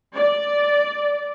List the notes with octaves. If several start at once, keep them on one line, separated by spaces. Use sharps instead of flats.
D5